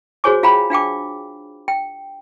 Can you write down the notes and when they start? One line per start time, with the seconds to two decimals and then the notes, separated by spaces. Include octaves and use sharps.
0.24 F#4 G#4 C5 C#5 G#5 D6
0.43 F4 F5 G5 A#5 B5
0.70 D4 F5 G5 D6
1.68 G5